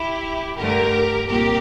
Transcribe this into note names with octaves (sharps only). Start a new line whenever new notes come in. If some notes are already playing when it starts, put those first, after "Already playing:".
Already playing: E4 G4
G2 D3 A3 G4 A#4
C2 A#2 G4 A#4